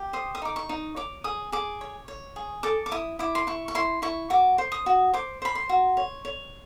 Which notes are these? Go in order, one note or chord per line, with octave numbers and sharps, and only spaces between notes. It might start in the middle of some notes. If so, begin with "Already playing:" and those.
Already playing: G4
C5 D#6
D#6
D#4 D6
C#6
D#4
C#5 D6
G#4 D#6
G#4 D6
C#5
C#5
G#4
A4 D6
D6
E4 D#6
E4 D6
C6
E4 C#6
C#6
E4 C6
E4 C#6
F#4 D6
C5
D#6
F#4
C5 D6
C5 B5
C6
F#4
C#5
C#5